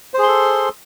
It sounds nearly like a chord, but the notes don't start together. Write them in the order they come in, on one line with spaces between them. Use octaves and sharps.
C5 G#4 C6 A4